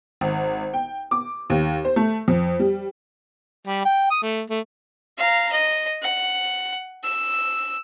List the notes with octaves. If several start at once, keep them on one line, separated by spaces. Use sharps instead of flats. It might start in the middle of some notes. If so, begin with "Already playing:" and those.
G#1
G5
D6
D#2
C5
A3
F2
G3
G3
G5
D#6
A3
A3
F5 A#5
D#5
F#5
E6